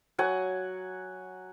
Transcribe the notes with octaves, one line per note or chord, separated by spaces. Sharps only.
F#3 F#5 G#5